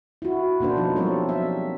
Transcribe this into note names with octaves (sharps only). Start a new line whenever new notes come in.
E4 F#4
B2 A#3 D4 C5
F3 D#4
F#3 G3 C4 G4 A4 C#5
E5